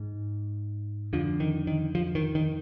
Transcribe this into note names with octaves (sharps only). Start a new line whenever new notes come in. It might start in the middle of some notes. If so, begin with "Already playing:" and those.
Already playing: G#2
F2 D3 F3
D#3
D#3
F3
D#3
D#3